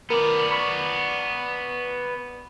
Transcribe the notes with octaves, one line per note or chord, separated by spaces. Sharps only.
B3 A#4 D5
B5 C#6